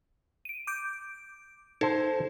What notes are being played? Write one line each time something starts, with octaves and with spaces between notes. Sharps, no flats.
D7 D#7
D6 G6 D7
D#4 A4 C5